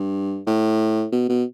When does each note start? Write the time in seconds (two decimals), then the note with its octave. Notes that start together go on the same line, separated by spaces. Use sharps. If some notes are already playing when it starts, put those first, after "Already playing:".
Already playing: G2
0.47 A2
1.12 B2
1.29 B2